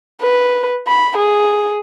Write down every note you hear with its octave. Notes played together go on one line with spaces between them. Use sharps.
B4
B5
G#4